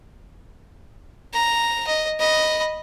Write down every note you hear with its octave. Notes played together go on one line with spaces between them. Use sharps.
A#5
D#5
D#5 B5